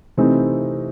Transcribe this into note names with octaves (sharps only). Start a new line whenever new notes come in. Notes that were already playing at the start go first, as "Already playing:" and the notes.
C3 E3 A3 C4 D#4